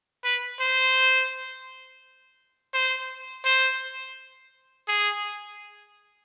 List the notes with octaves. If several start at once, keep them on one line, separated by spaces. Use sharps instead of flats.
B4
C5
C5
C5
G#4